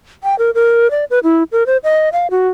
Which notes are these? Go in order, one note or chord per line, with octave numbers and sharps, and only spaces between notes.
G5
A#4
A#4
D5
B4
E4
A#4
C5
D#5
F5
F#4